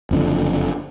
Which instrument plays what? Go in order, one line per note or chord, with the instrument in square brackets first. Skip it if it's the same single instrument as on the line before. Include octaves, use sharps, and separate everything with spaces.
[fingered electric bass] F#1 F2 D3